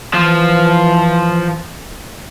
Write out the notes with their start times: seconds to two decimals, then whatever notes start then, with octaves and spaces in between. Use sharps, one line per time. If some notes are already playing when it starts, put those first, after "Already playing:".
0.13 E3 F3